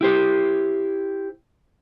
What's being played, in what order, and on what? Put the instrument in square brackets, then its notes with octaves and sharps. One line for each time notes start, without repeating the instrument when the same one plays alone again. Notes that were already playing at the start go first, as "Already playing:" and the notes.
[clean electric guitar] E4 G4 C5